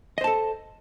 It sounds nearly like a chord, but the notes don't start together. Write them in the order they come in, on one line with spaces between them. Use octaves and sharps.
D#5 C5 A5 A4